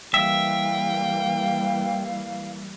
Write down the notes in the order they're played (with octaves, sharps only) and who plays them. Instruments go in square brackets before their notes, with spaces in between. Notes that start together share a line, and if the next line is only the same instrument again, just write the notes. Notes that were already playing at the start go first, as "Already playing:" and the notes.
[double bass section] E3 G3 A#3 [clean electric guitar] E5 [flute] F5 [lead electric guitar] G5